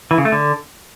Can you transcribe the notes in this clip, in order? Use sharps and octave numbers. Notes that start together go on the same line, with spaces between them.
E3
C#3
A3
D3